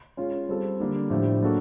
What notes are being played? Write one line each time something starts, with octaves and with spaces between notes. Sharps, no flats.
G#3 C#4 F4
G3 C4 F4 A4
D3 G3 A#3 D4
A2 F3 A3 D4 G4
F#3 A#3 D4 F#4 A4